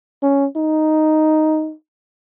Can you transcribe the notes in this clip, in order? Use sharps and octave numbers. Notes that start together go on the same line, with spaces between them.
C#4
D#4